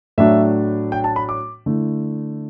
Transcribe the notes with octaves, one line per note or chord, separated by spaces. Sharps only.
A2 F#3 A3 D4 E5
G5
A5
B5
D6
D3 A3 E4